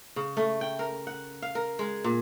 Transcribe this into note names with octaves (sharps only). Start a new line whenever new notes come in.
C#3
A3
G5
A#4
F#5
F5
A#4
G#3
A#2